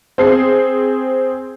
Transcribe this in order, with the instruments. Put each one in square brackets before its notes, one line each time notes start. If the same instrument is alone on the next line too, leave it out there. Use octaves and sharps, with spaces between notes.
[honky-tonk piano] C4 G#4 C7